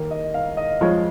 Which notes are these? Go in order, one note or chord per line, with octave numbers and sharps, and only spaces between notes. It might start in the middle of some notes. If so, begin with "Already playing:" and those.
Already playing: D#2 D#3 A#3
D#5
F5
D#5
F2 F3 G#3 C#5